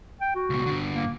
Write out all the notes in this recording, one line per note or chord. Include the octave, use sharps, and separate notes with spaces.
G5
F#4
C#2 B2
G2 D3
A#3